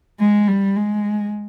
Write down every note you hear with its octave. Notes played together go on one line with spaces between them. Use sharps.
G#3
G3
G#3